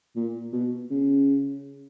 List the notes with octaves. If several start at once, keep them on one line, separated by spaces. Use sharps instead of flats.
A#2
B2
C#3